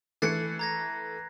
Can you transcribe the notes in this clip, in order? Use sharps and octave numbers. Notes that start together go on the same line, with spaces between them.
E3 A3 F#6 A6 C7 C#7
A#5 G#6 A#6